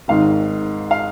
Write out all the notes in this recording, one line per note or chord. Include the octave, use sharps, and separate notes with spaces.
G#1 G#2 D#3 F5
F5